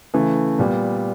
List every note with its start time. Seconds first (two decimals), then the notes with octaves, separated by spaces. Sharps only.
0.14 C#3 E3 A3
0.58 A#2 G3 B3